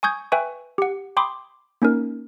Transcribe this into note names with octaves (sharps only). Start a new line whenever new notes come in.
G#5 C#6 D#6 G6 G#6
B4 E5 G5 G#5 C#6
G4 F#5
G5 B5 C6 D6 D#6
A#3 C#4 D#4 A#4